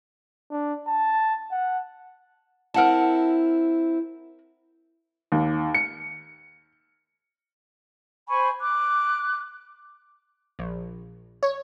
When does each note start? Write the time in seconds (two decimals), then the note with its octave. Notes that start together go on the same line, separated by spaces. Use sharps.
0.51 D4
0.87 A5
1.51 F#5
2.74 C4 E4 A#4 F#5 A5
5.32 D#2
5.75 C#7
8.28 C5 G#5 B5 C#6
8.61 D6 F#6
10.59 A#1
11.43 C#5